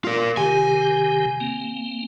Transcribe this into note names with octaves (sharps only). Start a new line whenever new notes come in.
F4 A#4
C3 D#3 G4 G#5
A#3 C4